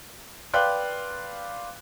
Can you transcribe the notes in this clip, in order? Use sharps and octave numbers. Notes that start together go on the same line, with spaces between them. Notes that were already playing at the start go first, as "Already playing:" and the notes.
B4 D5 F5 G5 C6 F#6